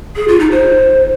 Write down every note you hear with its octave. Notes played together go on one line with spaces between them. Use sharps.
G#4
F4
D#4
C5